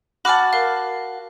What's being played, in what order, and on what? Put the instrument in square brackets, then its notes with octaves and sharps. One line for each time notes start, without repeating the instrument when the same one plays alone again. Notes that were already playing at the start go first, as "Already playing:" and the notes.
[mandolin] F#4 A5 [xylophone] B5 D6 F6
[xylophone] A#4 F5